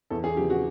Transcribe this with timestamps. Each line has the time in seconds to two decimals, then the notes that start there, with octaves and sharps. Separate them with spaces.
0.10 E2 A4
0.24 G#4
0.37 C#3 F3 G4
0.50 F#4